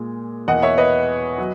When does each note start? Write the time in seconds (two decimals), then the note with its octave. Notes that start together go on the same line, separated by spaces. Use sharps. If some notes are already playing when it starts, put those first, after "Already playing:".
Already playing: A#2 G#3
0.48 E2 B2 A#3 D#5 F#5
0.62 C#5 E5
0.78 B4 D#5
1.38 F#3